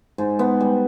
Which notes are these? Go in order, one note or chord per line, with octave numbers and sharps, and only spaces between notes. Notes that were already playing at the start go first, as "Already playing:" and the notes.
G#2
B3
G3